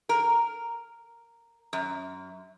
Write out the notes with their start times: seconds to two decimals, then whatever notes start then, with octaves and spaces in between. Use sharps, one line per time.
0.09 A#4
1.73 F#2